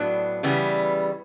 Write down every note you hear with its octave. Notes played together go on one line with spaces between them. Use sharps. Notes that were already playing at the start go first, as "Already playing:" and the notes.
Already playing: A2 F#3 B3 D4
C#3 E3 G3 B3